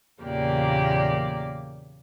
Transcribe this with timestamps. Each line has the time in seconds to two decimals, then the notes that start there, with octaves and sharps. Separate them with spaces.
0.21 E2 A#2 C#3 A#3 G4 D5